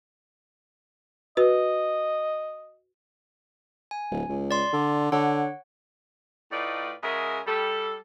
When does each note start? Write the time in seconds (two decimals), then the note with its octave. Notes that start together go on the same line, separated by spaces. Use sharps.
1.37 F#4 B4 D#5
3.91 G#5
4.11 D1
4.29 C#2
4.51 D5 C6
4.73 D3
5.12 D3 C#5 F#5
6.52 A2 A3 D#4 F4 B4 D5
7.03 C#3 G#3 F#4 G#4 A#4 E5
7.46 G3 A4